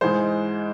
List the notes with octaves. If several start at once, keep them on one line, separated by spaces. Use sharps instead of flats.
G#2 E3 G#3 C5